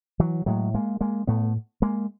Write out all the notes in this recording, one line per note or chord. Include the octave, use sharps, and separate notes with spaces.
E3 F#3
A2 F#3 G#3
G#3 A#3
G#3 A#3
A2 A3 B3
G#3 A#3